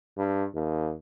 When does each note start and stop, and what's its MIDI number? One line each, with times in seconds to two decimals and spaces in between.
0.18 0.45 43
0.54 0.94 39